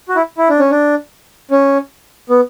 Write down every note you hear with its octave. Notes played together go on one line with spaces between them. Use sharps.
F#4
E4
E4
D4
C#4
D4
C#4
B3